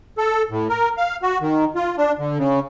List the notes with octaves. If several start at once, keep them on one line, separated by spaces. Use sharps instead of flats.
A4
A2
A#4
F5
F#4
D#3
F4
D4
D3
C#3